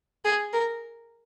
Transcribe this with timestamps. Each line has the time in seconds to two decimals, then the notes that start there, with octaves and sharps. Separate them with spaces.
0.25 G#4
0.53 A#4